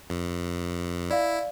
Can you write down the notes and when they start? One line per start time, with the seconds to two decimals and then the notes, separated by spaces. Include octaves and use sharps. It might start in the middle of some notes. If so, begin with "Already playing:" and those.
0.10 F2
1.10 E4 D5 F5